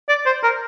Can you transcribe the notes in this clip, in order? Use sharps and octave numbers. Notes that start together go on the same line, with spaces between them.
D5
C5
A#4